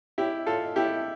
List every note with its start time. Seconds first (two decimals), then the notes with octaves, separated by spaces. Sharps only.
0.18 E4 G4
0.46 F4 A4
0.76 E4 G4